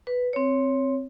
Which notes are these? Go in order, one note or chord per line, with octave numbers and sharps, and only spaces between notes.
B4
C4 C#5